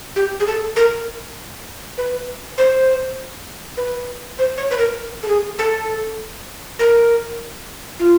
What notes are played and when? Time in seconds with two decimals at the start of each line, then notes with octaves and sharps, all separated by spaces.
0.16 G4
0.40 G#4
0.47 A4
0.76 A#4
1.98 B4
2.58 C5
3.77 B4
4.39 C5
4.58 C#5
4.71 B4
4.78 A#4
5.23 A4
5.28 G#4
5.59 A4
6.79 A#4
7.99 F4